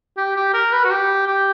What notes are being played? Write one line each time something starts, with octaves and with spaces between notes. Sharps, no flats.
G4
G4
A#4
B4
F#4
G4
G4